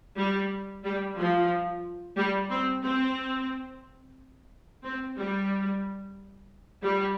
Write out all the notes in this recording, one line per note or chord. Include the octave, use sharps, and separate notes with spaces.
G3
G3
F3
G3
C4
C4
C4
G3
G3